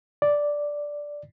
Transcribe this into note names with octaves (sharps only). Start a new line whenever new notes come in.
D5